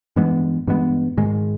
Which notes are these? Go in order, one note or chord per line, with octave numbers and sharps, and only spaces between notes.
G2 E3 G#3 B3
G2 E3 G#3 B3
G#2 D#3 G#3